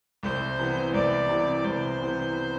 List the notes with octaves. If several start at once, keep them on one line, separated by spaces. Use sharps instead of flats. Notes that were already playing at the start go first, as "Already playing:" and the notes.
C2 C5
C3 E3 B3
C2 D5
C3 E3 B3
C2 C5
C3 E3 B3